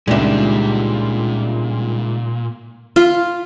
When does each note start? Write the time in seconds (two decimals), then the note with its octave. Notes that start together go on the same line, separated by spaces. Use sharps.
0.08 C#2 A#2 D#3 G3 G#3 D4 F4 E5
2.96 F4